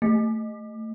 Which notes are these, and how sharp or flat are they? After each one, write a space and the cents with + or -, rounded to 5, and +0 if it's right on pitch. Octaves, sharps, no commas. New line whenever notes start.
A3 +20